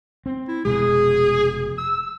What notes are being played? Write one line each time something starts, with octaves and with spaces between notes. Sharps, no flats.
C4
E4
F1 B2 G#3 G#4
E6